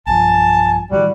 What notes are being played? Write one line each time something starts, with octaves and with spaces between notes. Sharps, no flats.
B1 G2 F3 G#5 A5
A2 D#3 E3 G3 F#4